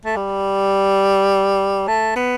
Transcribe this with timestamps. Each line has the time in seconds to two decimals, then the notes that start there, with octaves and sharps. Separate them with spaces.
0.05 A3
0.16 G3
1.88 A3
2.16 B3